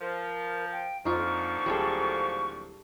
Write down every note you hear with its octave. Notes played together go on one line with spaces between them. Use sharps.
F3 A#4
G5
F2 A#2 D3 F3 D#4 F4 C#6
D1 G3 G#4 A4